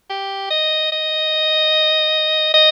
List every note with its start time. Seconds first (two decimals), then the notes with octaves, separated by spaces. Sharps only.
0.10 G4
0.50 D#5
0.92 D#5
2.54 D#5